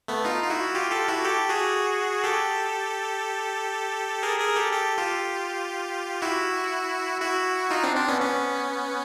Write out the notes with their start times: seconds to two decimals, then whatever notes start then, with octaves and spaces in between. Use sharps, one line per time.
0.08 A3 B3
0.25 D#4 F4
0.43 F4
0.50 E4 F#4
0.75 F4 G4
0.91 G4 A4
1.08 E4 F#4
1.24 G4 A4
1.49 F#4 G#4
2.24 G4 A4
4.23 G#4 A#4
4.40 G#4 A#4
4.56 G4 A4
4.73 G4 A4
4.97 F4 G4
6.22 E4 F#4
7.21 E4 F#4
7.71 D#4 F4
7.83 C4 D4
7.95 C4 D4
8.08 B3 C#4
8.21 B3 C#4